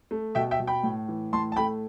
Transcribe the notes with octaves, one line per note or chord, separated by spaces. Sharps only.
A3
B2 E5 G5
E5 G5
B2
G5 B5
A2
E3
A2 A5 C6
A5
A3 G5 B5